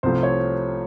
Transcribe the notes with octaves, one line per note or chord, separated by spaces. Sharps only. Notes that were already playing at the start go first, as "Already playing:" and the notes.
C2 C3 F3 A3 C5
C#5